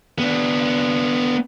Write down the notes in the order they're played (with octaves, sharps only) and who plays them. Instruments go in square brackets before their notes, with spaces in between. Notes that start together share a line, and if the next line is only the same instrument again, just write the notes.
[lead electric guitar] B3 D4